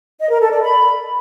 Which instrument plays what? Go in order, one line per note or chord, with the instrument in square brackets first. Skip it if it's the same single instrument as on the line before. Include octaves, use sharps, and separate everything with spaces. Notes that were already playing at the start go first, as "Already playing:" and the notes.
[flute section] D#5
A#4
A4
D5
B5